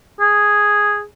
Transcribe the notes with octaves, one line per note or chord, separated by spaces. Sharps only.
G#4